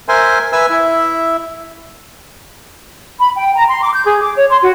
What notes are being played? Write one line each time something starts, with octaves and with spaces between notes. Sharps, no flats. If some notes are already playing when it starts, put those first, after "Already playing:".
A#4 C5 E5 G#5 C6
B4 E5 G#5 E6
E4 E5
B5
G5
A#5
C6
D6
G6
G#4
D6
C#5
C6
F#4